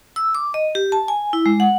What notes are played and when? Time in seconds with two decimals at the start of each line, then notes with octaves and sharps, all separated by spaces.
0.16 E6
0.35 D6
0.54 D#5
0.75 G4
0.92 A5
1.08 G#5
1.33 E4
1.46 G#3
1.60 F#5